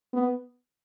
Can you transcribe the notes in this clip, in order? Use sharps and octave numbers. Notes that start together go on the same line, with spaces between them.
B3